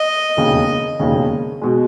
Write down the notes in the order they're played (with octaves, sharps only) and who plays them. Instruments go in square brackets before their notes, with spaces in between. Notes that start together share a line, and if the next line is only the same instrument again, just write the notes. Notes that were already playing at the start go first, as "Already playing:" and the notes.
Already playing: [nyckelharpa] D#5
[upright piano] E1 D#2 C#3
E1 D#2 C#3
B2 G#3